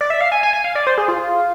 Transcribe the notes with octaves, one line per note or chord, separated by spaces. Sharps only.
D5
E5
F5
G#5
G#5
G#5
F5
D5
C5
G#4
F4